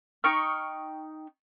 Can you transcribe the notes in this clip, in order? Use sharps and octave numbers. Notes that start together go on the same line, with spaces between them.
D#4 G5 C#6 F6